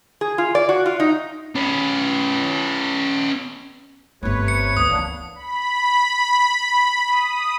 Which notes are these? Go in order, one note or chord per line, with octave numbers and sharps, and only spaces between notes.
G#4
F4
D5
F#4
F4
D#4
C#4 B4
G1 C3 A3 B4 C#5
C#7
D2 D#6
E3 A#3 B3 D4
B5
D#6